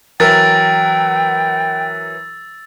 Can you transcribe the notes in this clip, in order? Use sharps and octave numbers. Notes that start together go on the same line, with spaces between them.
E3 F#3 A#4 G5 E6 A6